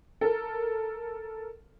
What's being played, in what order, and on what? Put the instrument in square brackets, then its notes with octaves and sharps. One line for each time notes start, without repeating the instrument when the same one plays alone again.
[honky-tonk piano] A4 A#4